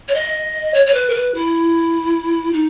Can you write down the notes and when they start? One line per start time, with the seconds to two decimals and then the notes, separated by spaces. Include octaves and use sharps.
0.08 C#5
0.14 D#5
0.74 C#5
0.86 C#5
0.94 B4
1.09 A#4
1.14 B4
1.34 E4
2.53 D#4